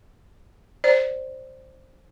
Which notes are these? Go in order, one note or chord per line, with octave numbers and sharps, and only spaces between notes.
C5 D5